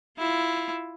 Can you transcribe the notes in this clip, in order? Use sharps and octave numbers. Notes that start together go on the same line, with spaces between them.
E4 F4